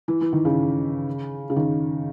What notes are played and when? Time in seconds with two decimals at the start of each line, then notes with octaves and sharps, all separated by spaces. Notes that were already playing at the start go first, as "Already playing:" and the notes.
0.08 E3
0.21 E3
0.33 D#3
0.45 C#3
1.50 C#3
1.56 D#3